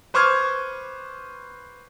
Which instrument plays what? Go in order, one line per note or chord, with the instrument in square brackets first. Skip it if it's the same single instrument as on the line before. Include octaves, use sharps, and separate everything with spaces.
[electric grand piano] B4 C5 C#6 D6 F6 G#6